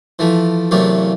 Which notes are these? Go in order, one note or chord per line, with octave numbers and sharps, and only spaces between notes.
E3 F3 A3
E2 C3 F#3 A3 A#3